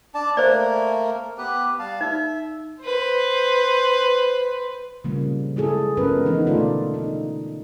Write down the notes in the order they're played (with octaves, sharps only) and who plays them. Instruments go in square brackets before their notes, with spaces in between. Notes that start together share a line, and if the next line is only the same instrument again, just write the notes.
[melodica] D4 D5 A5
[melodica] A3 A#3 A#4 [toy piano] C5 D5
[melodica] B3 G4 B4
G3 F5 A5
[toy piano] D#4 [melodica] E5
[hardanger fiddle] B4 C5
[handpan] C#3 F3 G3 A#3
G#3 E4 G#4 A4
F3 G#3 B3 C#4 A#4 B4
E3 B3 D#4
B2 D3 A3 F4 A4 D5
D#4